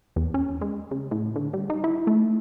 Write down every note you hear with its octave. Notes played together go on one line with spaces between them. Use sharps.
E2
C#4
G#3
C#3
A2
D3
G3
D#4
E4
A3